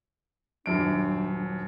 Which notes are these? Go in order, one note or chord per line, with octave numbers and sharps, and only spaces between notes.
D#1 F#2 D4 D7